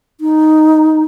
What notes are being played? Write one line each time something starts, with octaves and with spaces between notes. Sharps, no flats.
D#4